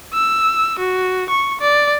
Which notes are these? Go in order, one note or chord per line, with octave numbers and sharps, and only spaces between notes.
E6
F#4
C#6
D5